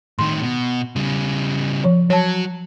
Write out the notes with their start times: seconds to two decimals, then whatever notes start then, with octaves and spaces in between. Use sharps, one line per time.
0.19 A2 D#3 C6
0.43 B2
0.96 C#3 G3
1.84 F3 C#5
2.10 F#3 C#5 A5